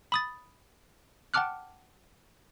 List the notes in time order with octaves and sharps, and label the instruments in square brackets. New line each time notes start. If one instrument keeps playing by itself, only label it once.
[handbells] B5 D#6 A6
F#5 G5 A5 D6 F6 F#6